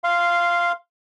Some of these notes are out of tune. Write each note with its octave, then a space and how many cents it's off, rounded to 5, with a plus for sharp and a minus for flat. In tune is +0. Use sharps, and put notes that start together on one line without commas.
F5 -10 C6 +0